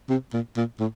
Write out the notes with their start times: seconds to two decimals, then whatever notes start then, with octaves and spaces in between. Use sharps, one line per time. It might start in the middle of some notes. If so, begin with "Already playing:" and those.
0.09 C3
0.33 A#2
0.57 A#2
0.80 A2